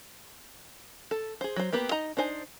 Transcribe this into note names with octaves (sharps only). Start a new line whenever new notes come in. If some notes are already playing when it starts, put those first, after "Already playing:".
A4
G#4 C5
F#3 C5
A#3 B3 G4 B4
D#4 D#5 A#5
D4 D#4 C5 G#5